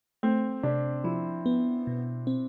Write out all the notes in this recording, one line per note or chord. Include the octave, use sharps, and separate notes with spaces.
A3 C4
C3 D4
F3 E4
B3
B2
C4